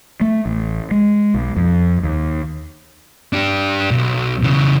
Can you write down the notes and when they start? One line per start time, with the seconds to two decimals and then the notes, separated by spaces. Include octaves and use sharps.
0.21 A3
0.46 A1
0.91 G#3
1.34 B1
1.56 F2
2.03 D#2
3.33 D4 G4
3.91 B1
4.43 C#3 E3